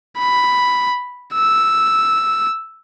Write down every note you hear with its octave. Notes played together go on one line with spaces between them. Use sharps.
B5
E6